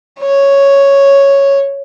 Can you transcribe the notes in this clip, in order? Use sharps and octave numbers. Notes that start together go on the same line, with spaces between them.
C#5